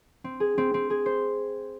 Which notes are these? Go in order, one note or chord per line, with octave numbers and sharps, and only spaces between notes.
C4
G#4
C4
C4
G#4
C5